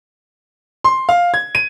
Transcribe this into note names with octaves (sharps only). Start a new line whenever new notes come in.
C6
F5
G#6
D#7